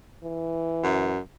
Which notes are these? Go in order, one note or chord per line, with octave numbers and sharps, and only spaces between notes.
E3
F#2